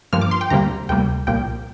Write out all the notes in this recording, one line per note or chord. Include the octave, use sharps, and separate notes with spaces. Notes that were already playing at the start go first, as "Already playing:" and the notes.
G2 F3 A#3 F6
D6
C6
G5
D2 C3 G3 A#3 A#5
D2 C3 G3 A#3 G5
C2 A#2 F3 A#3 G5